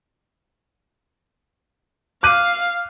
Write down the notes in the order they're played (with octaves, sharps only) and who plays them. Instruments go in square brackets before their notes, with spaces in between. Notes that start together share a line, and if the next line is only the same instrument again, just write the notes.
[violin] F5 [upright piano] D6 F#6 D#7